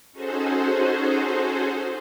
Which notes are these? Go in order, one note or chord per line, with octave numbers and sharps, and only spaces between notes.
C#4 D#4 F#4 G#4 A4 C5